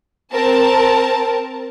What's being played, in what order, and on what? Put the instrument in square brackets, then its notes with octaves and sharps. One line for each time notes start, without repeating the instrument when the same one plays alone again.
[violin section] C4 A#4 A5